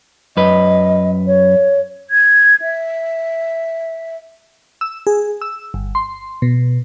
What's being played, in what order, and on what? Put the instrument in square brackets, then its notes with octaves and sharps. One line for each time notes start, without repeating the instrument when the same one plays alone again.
[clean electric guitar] F#2 B4 [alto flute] D#5
[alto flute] C#5
[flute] G#6
E5
[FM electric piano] E6
G#4
E6
G1
C6
B2